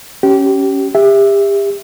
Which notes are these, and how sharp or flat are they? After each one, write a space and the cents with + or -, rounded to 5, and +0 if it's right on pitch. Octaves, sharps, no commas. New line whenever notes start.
C#4 +0 G4 -25
G4 +35 E5 +0